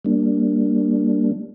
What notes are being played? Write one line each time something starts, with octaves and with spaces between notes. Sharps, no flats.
G3 A#3 D4